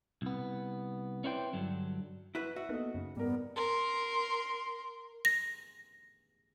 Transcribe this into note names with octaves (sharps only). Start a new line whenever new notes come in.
C2 B3
C#4 E4 B4 C5 D5 G5
G2 D3 F#3
E4 F#4 B4
F#4 E5
A#3 B3 D#4 A4 D#5
F#2 C#3
G#2 G3 B3 A#4
A#4 C6
A#6